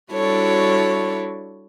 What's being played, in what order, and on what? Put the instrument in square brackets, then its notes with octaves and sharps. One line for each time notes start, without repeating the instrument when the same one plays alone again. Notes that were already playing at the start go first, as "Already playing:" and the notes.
[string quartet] G3 D4 E4 F#4 A4 C#5